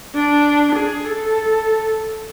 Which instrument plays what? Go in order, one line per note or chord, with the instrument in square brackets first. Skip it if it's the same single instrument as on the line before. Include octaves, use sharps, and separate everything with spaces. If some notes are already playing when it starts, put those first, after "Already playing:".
[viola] D4
G#4
A4